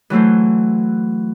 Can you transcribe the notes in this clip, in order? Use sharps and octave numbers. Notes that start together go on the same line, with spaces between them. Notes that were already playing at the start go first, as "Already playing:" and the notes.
E3 F#3 A3 C5